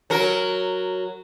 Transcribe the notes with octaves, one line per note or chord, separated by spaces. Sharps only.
F#3 A#4